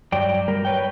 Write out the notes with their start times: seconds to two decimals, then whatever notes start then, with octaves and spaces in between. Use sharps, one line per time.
0.12 G2 F#3 D5 G5
0.48 G3 A#4
0.65 B4 C#5 G5